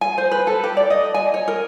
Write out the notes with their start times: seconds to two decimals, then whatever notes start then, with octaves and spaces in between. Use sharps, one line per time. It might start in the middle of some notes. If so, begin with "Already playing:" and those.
0.01 G#5
0.18 C5
0.31 B4
0.47 A4
0.64 G4
0.77 D5
0.90 D#5
1.14 G#5
1.34 C#5
1.48 A#4